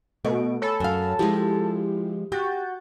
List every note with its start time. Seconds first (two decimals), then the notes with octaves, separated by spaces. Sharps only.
0.25 B2 A3 D#5 D7
0.62 A4 C#5 G#5 B5
0.80 F#2 F5
1.19 F3 G#3 E4 F4 G4
2.32 F#4 G4 G6 A6